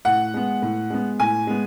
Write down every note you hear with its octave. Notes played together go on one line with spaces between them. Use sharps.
A2 F#5
G#3 B3
A2
G#3 B3
A2 G#5
G#3 B3